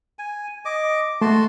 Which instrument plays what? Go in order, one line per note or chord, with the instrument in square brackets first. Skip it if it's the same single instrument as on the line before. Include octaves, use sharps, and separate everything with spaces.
[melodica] G#5
D#5 D6
[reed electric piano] A3 [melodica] F#4 A5 C6